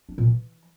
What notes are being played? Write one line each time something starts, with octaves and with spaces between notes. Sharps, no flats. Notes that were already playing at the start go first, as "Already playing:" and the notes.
D4
A#2
E3